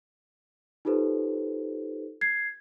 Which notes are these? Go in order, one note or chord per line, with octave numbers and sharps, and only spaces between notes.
D#4 F4 G4 A4 B4 C5
G#6 C7